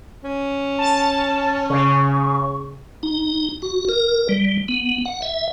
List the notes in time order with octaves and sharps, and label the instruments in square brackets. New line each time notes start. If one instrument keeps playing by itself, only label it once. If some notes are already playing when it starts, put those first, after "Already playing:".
[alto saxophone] C#4
[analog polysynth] A5
[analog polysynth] C#3 [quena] C#6
[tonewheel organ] D#4
F#4
A#4
G3
B3
F#5
E5